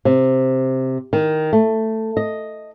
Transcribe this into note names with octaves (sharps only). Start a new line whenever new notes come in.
C3
D#3
A3
D#5